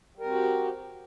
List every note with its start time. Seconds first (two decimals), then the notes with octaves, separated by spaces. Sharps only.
0.15 G3
0.20 A#4
0.25 C4
0.30 F#4
0.35 G4